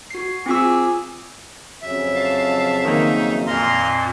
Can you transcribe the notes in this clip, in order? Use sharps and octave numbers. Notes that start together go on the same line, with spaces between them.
F#4 C7
C4 F4 G#4 D6 E6
F2 C#3 F#3 E5
F5 A5
D#3 A#3 D#4
F2 A#2 F5 A#5 C6